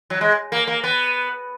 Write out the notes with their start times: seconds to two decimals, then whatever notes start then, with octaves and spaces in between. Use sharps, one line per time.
0.10 F#3
0.21 G#3
0.52 A#3
0.67 A#3
0.84 B3